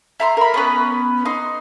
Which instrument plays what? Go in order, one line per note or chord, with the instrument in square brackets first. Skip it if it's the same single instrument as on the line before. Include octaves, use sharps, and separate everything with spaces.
[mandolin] E5 A#5 C6
A#4 B5
B3 C#4 B4
D#4 C6